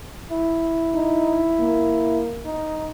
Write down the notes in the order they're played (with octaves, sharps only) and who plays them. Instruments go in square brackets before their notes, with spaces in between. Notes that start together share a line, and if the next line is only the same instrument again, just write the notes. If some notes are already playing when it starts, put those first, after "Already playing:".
[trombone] E4
[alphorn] D#4
A#3
[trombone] D#4